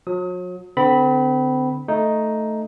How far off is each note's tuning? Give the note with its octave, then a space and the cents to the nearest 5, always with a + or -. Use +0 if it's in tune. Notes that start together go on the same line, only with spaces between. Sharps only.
F#3 -40 D#6 +35
D3 +0 C4 -35 B5 +0
A3 +0 D#4 +0